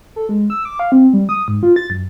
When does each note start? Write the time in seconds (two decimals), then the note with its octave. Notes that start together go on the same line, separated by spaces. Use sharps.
0.16 A4
0.29 G#3
0.50 E6
0.65 D6
0.79 F5
0.92 C4
1.13 G3
1.29 D#6
1.48 G#2
1.63 F4
1.76 A6
1.90 F#2